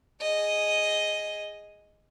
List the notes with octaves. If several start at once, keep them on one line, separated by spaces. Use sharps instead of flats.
G#4 D#5